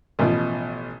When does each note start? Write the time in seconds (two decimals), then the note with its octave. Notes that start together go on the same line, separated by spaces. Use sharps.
0.19 A1 B2 F3